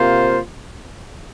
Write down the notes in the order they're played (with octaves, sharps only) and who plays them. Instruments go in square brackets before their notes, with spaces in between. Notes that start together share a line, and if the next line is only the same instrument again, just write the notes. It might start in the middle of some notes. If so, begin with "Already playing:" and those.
Already playing: [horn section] C3 A#3 F4 C5